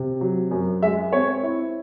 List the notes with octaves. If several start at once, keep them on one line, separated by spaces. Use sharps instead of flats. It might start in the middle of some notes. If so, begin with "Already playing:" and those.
Already playing: C3
F#3
F#2
G#3 E5
C4 C#5
E4